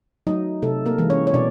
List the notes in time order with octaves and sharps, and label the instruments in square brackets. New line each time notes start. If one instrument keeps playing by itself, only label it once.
[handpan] F#3 A3 D#4 D#5
C3 A3 A4
A#3 A#4
E3 G#3
C#4 C#5
C#5
B2 D4 D5